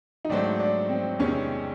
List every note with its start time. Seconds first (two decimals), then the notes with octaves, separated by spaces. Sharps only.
0.25 D#4
0.29 G#2 D#3 F#3 A3 C4 D4
0.59 D4
0.89 C4
1.19 E2 C3 D#3 G#3 C#4